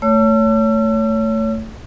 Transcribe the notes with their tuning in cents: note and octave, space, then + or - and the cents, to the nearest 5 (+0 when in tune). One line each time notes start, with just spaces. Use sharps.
A3 +15 C#5 +20 E6 +40